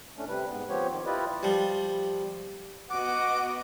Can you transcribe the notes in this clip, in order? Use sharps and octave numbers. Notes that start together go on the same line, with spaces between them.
A2 A3 C#4 D4
C3 G3 B4
G#2 B3
F3 B3 C4 G4 C#5
D#3
E4 F4 G4 B4 D5 D#5
F3 G3
B3 F#4 D#5 F#5 D6